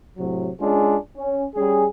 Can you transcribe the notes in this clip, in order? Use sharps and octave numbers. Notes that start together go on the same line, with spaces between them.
A2 C3 F#3
G#3 C#4 D4 F4 G#4
C#4
G3 C#4 G#4